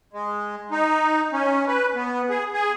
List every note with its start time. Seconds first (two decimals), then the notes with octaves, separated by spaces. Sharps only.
0.13 G#3
0.71 D#4
1.32 C#4
1.68 B4
1.95 B3
2.30 G#4
2.53 G#4